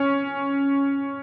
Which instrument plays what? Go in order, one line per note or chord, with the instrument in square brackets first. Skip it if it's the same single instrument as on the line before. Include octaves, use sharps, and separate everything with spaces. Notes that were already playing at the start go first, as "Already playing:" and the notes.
Already playing: [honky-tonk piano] C#4